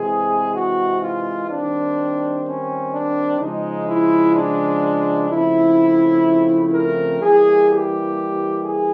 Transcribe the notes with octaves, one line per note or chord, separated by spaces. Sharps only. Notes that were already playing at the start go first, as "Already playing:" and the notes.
Already playing: C3 E3 G#3 C4 G#4
F#4
F4
D#3 G3 C4 D4
C#4
D4
C#3 F3 G#3 D#4
E4
D4
C#3 F3 A3 C4 E4
A#4
E3 G3 A#3 G#4
G4
G#4